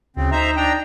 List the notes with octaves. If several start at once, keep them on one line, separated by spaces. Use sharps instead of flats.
D2 C#3 C4
D#4 C5 E5 A#5
D4 G5 A#5